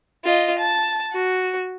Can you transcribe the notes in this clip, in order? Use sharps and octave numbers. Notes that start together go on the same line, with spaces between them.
F4 D#5
A5
F#4